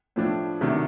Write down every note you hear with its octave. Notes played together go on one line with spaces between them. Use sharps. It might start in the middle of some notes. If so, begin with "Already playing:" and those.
A2 F3 A3 D4
C3 D#3 F#3 A3 D4